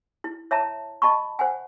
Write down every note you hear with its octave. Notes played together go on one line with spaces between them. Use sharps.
E4
C#5 E5 A5 A#5
D#5 A5 B5 C#6
C5 F#5 G#5